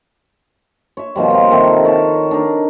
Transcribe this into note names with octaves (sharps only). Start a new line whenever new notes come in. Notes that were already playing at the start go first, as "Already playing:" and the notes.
C#5 E5
B2 D#3 F3 G3
A#3 C4
C3 D#3 A4
A#4 C#5 A5
D4 D#4 A#4